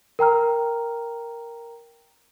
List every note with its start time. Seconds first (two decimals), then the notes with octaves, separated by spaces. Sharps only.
0.19 A#4 G5 A#5 F6